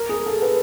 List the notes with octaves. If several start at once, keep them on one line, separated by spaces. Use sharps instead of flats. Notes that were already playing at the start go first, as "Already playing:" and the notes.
Already playing: A#4
G#4
A4
B4